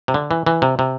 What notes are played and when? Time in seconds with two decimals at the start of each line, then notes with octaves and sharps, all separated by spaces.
0.08 C3
0.14 D3
0.31 E3
0.46 E3
0.62 C3
0.79 C3